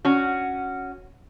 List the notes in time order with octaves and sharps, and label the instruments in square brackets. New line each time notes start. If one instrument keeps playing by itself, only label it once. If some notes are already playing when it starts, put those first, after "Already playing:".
[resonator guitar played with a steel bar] C#4 F#4